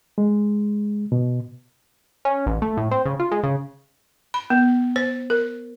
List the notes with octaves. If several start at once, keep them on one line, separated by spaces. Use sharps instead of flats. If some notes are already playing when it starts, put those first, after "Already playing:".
G#3
B2
C#4
A1
A3
A2
C4
C#3
F4
G#3
C#3
B5
B3
C5
A#4